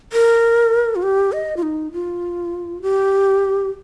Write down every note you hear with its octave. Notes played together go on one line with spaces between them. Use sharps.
A#4
F4
G4
D#5
F4
D#4
F4
G4